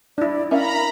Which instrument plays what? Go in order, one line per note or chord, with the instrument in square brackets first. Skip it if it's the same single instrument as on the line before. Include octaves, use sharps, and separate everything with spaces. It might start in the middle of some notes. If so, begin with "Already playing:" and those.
[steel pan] D4 E4 [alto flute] D5
[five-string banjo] C#4 E5 F5 [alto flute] A#4 [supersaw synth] A#5 B5